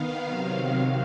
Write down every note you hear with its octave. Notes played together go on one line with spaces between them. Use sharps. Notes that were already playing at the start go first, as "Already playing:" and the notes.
Already playing: D#3 B3 F5
C3 D#3 F#3